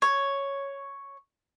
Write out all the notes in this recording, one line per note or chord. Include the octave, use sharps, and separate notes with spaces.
C#5